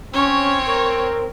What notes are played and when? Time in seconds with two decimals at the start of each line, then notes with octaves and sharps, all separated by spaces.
0.14 C4 C#4 C#5
0.66 A#4